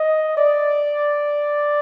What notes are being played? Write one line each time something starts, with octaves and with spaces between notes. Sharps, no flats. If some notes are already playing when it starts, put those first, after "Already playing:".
Already playing: D#5
D5